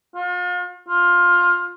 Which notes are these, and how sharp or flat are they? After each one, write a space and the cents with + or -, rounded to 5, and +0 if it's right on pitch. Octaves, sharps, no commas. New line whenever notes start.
F4 +40
F4 +15